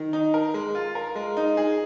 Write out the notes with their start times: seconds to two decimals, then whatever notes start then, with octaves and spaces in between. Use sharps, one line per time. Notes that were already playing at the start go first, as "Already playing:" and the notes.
Already playing: D#3
0.13 D#4
0.34 A#4
0.54 G#3
0.75 F4
0.95 A#4
1.15 G#3
1.37 D#4
1.57 G#4